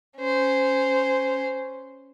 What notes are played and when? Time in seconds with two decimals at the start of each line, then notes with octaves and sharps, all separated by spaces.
0.18 C#4 C5